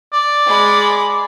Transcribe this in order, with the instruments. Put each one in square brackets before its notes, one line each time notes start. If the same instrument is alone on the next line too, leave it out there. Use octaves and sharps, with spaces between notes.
[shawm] D5
[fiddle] G#3 B5